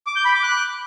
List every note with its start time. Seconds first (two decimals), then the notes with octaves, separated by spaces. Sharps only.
0.07 D6
0.16 G6
0.25 B5
0.34 D6
0.43 F#6